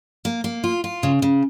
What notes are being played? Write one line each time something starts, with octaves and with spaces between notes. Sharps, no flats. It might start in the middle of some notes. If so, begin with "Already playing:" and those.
A#3
A#3
F4
F4
C#3
C#3